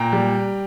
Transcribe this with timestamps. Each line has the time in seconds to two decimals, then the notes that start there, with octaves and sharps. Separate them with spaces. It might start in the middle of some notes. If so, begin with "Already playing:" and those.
Already playing: A#2 G5 A#5
0.13 G3